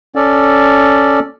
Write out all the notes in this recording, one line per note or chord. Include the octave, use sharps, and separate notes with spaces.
C#4 A4 D5